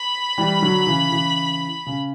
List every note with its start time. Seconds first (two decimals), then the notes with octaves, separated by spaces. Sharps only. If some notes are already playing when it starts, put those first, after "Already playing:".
Already playing: B5
0.38 E3 G3
0.62 D3 F#3
0.87 C#3 E3
1.12 C#3 E3
1.86 C#3